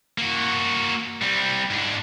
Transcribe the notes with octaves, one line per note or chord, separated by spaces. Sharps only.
A#3 F#4
G3 C4
G#2 D4